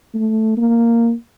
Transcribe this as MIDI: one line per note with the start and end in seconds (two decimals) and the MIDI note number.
0.14 0.53 57
0.57 1.13 58